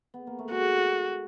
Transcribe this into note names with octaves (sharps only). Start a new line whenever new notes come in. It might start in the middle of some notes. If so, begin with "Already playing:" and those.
B3
A#3
A3
G#3 F#4